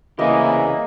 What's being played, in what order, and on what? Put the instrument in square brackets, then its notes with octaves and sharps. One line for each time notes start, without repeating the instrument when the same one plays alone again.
[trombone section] C2 E3 [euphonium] C#3 [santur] A#3 D#5 [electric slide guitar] G4 E5 G#5